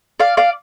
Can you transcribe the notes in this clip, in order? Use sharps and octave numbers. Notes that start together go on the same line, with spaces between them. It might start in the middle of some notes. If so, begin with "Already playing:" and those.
D5 F5
D5 F5